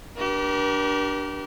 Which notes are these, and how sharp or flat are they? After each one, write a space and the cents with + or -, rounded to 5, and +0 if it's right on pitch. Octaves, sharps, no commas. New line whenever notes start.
D4 +0 G4 -30 A#4 +40